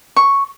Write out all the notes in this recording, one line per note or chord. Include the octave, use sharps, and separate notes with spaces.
C#6